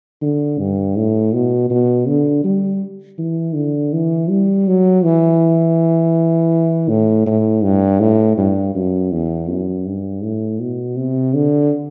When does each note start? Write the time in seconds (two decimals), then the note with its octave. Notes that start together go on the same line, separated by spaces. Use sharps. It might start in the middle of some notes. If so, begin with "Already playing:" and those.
0.21 D3
0.59 G2
0.96 A2
1.33 B2
1.70 B2
2.07 D3
2.44 G3
3.18 E3
3.55 D3
3.93 E3
4.30 G3
4.67 F#3
5.04 E3
6.89 A2
7.26 A2
7.63 G2
8.00 A2
8.37 G2
8.75 F#2
9.12 E2
9.49 F#2
9.86 G2
10.23 A2
10.60 B2
10.97 C3
11.34 D3